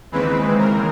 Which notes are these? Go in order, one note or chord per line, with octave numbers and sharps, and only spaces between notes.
D#2 C#3 E3 G#3 C4 B4
A#4